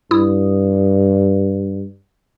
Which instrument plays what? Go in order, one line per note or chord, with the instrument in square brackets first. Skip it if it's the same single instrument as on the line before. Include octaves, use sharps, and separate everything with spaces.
[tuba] G2 [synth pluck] E4 D#6